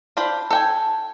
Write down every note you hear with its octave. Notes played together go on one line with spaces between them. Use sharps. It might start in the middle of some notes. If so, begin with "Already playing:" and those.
D4 F4 C5 B5
A4 G5 G#5